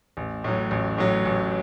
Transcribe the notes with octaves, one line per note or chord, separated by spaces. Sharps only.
A1
A2 F#3
A1
A2 F#3
A1